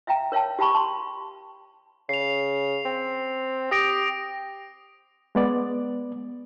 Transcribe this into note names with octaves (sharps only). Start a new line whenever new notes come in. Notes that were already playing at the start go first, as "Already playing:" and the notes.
E5 F5 G5 A#5
A#4 C#5 F5 G5 A5
G4 F5 A5 B5 C#6
A5 C6
C#3 C7 F7
C4
G4 D#6 A#6 D7
G#3 B3 D5